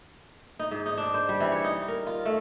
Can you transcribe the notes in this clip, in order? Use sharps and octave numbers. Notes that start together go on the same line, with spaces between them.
D#4
G#2
D#4
D4
C5
G3
E3
C#5
D#4
A#4
F4
A3